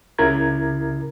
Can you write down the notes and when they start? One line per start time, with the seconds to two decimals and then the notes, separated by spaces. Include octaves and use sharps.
0.19 C#2 C#3 E4 A#4 A#5 G#6